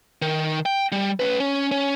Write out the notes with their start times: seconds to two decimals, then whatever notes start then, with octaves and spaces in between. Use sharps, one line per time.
0.22 D#3
0.66 G5
0.92 G3
1.20 C#4 B4
1.40 C#4
1.71 C#4